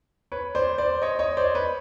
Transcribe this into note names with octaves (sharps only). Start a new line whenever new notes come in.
B4 C#5
C5 D5
C5 D5
C#5 D#5
C#5 D#5
C5 D5
B4 C#5